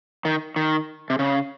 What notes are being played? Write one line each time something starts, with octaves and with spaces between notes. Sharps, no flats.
D#3
D#3
C3
C#3